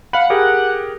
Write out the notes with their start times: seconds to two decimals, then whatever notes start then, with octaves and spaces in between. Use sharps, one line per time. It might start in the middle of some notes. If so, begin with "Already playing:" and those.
0.13 F5 F#5 B5
0.30 G4 G#4 A#4